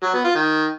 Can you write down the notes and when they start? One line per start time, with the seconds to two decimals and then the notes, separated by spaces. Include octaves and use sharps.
0.03 F#3
0.14 B3
0.24 F4
0.35 D#3